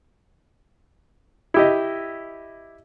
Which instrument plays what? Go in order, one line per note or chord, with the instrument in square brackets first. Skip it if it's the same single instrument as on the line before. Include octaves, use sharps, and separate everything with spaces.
[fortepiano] E4 G4 D#5